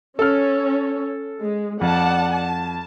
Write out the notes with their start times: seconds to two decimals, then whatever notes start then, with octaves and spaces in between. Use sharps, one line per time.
0.19 C#4 A4 C#5 F6
1.40 G#3
1.81 F2 D5 F#5 A5
2.33 A5